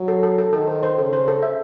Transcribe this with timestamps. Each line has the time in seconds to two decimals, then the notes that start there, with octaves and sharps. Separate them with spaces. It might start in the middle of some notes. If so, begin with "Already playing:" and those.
Already playing: F#3
0.08 A4
0.23 A4
0.38 A4
0.53 D#3 A4
0.68 C5
0.83 C5
0.98 C#3 A4
1.13 C5
1.28 A4
1.43 E5